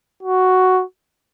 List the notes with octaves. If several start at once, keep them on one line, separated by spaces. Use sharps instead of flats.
F#4